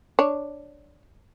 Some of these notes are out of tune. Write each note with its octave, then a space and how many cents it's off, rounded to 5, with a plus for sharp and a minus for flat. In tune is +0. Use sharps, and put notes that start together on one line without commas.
D4 +0 C#5 +0